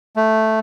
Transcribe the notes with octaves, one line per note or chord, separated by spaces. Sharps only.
A3